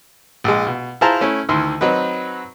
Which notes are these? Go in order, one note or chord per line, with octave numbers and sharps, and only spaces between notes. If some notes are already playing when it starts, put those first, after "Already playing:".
A#1 G#3
B2
E4 F4 G#4 C5 A5 A#5
A3 C#4 E4
D2 D#3 E4 C6
F#3 C4 D#4 B4